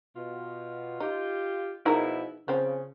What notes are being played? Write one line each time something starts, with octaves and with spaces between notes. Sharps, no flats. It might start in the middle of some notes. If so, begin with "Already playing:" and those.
B2 F4
D#4 F4 G4
B2 F3 D#4 E4 G#4 A#4
C#3 F3 C4